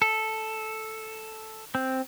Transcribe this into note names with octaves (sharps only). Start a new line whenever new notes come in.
A4
C4